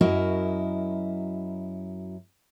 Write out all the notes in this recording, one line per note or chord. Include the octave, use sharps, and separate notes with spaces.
F#2 E4 F#4 A#4 D#5